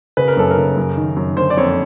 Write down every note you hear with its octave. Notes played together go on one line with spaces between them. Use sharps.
C#3 B4
A#4
F#2 A4
A#4
C#3
F#2
D#3
F#2
D3 C5
D5
F2 C#5